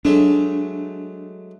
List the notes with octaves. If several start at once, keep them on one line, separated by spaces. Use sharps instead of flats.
F#3 G#3 A3 D4